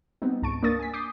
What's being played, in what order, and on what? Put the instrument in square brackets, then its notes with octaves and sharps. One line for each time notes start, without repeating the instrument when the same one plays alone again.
[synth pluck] G3 B3 C4 D#4
C#2 G#2 A5 C#6 D7
A#3 D4 A#4 C#6 D#6 A6
G#5 B6
D6 D#6 G6 C7